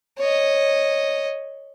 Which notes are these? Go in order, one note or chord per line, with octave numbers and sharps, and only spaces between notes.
C#5 D#5